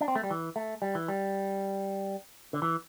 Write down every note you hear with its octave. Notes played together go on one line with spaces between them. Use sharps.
D4
C4
A3
G3
E3
A3
G3
E3
G3
D3
E3